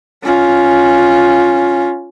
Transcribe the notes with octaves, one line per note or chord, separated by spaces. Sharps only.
C#4 F4